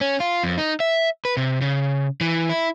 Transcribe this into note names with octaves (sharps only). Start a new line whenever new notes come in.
C#4
F4
F2
D#4
E5
B4
C3
C#3
E3
E4